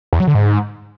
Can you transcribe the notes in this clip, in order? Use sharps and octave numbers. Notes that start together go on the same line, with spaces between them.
E2
F#3
D3
G#2